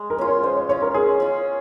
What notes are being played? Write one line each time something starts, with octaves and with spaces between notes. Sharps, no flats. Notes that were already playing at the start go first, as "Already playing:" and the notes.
Already playing: G#3
A#4
C#4 F4
C#5
G#3 C5
C#5
C#4 F4 C#5
A#4
G#3 G#4
C#4 F4